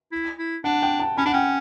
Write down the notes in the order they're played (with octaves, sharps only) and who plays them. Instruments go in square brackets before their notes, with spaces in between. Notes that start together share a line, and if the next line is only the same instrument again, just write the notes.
[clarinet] E4
E4
[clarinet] D4 [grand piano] F#5
[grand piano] G5
A5
[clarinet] C#4 [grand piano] B5
[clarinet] D4 [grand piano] F#5
[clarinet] C#4 [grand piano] G5